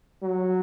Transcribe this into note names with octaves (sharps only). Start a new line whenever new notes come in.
F#3